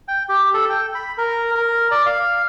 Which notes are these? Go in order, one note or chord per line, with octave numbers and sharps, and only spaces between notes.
G5
G4
A4
G5
B5
A#4
A#4
D5
F5